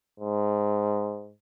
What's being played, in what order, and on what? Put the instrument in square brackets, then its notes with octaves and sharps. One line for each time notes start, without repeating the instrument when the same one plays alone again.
[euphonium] G#2